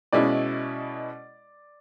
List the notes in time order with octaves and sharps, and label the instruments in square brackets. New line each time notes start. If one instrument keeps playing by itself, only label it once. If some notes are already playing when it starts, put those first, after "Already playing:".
[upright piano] B2 G#3 C#4 E4 D5